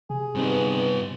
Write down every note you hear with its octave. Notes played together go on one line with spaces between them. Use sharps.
C3 G#4
G2 G3 B3 C4 D#4